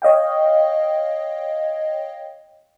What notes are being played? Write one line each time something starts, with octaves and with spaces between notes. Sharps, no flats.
C#5 D#5 F5 G5